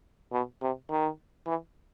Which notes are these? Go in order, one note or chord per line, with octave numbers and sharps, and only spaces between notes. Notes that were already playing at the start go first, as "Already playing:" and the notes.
B2
C3
D#3
E3